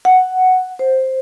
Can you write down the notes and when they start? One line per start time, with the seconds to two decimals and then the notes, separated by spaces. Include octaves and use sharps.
0.05 F#5
0.79 C5